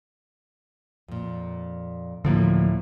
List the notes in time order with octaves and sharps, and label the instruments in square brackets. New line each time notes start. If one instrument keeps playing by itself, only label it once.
[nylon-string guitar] F2 A#2
[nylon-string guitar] D2 A2 [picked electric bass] D3 F3 A#3